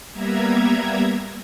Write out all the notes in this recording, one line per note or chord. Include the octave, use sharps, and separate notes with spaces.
G3 A#3 B3 E5 A#5 G#6